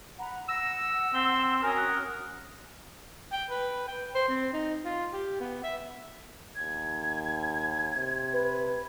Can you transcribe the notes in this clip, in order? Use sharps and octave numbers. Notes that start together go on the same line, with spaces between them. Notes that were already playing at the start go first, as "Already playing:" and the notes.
F#5 A#5 B5
F#5 E6 A#6
C4 G7
C#4 F#4 A#4 G#5 D#6
F#6
G5
B4
G5
C5
C4
D#4
F4
G4
B3
E5
D#2 G#6
C3
B4